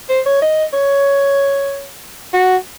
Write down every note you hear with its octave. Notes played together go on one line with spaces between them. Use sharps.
C5
C#5
D#5
C#5
F#4